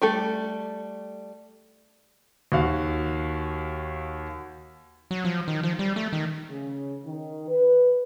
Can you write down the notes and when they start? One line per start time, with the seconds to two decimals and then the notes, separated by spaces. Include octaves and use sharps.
0.02 G3 A3 A4
2.52 D#2 F#4 F5
5.11 F#3
5.25 F3
5.48 D#3
5.63 F3
5.79 G3
5.96 A3
6.13 D#3
6.50 C#3
7.05 D#3
7.47 B4